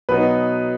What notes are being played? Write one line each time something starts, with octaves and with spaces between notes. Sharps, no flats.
B2 F#3 B3 D#4 B4